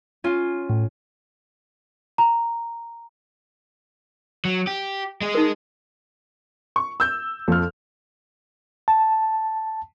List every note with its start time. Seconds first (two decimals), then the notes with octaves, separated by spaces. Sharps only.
0.24 C#4 F4
0.70 A2
2.18 A#5
4.45 F#3
4.67 G4
5.21 G#3 G#4
5.35 D#4 A#4
6.76 C#6
7.00 E6 G6
7.48 F2 F3 A4 F6
8.88 A5